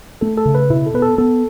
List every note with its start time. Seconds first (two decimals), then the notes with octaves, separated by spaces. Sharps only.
0.21 A3 A4
0.37 A4
0.45 C#3
0.55 B4
0.70 B2 E4
0.86 A4
0.94 B3 B4
1.02 A4
1.18 B3 A4